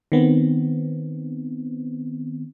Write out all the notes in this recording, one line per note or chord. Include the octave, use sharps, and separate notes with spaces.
D#3 B3 C4